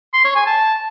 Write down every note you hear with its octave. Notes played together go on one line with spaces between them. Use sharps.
C6
C#5
G#5
A5